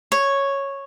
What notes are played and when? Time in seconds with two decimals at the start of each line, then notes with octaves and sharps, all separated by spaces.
0.12 C#5